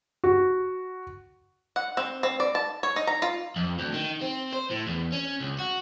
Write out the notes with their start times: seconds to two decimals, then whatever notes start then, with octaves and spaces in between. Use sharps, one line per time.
0.24 F#4
1.76 F#5
1.97 C4
2.23 C4
2.40 D5
2.55 A5
2.83 C#5
2.96 D#4
3.07 A#5
3.22 F4
3.56 F2
3.78 D2
3.93 D#3
4.21 C4
4.53 C5
4.71 A2
4.87 E2
5.12 C#4
5.40 C#2
5.59 F#4